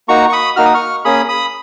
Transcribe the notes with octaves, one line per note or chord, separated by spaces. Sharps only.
A#3 D#4 F#4 A#5 C#6
C#6
B5 D#6
A#3 D#4 F#4 F6
D#6
C#6 F6
A#3 C#4 G#4 B5 D#6
B5 D#6